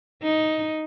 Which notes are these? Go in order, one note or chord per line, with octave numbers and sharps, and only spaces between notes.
D#4